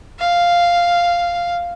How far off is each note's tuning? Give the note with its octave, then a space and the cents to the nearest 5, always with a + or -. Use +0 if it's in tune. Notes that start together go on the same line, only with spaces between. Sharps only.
F5 -5